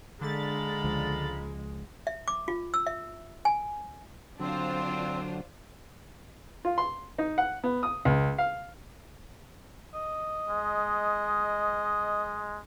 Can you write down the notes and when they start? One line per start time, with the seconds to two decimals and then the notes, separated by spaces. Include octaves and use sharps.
0.21 D3 G#3 F5 A#5 B5 A6
0.84 C#2 F3
2.07 E5
2.28 D6
2.48 F4
2.74 E6
2.87 E5
3.45 G#5
4.40 D3 F#3 C4 D4 F4 C5
6.65 F4
6.78 C6
7.18 D#4
7.38 F#5
7.64 B3
7.83 D#6
8.05 C#2
8.38 F5
9.95 D#5
10.49 G#3